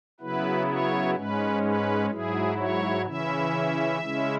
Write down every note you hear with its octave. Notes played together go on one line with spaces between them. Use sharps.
C#3 F#3 B3 E4 B4
C#5
G#2 G#3 C#4 B4
B4
G#2 F#3 E4 G#4
C#5
C#3 E3 C#4 E4 E5
C#3 G#3 C#4 E4